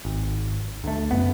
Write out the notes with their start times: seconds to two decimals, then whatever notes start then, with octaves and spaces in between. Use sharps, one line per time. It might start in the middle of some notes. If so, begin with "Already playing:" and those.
0.05 G#1
0.84 D2 A3
1.11 F#1 F#2 B3